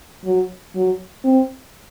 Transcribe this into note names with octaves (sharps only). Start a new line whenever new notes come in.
F#3
F#3
C4